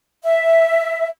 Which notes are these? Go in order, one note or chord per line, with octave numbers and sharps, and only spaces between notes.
E5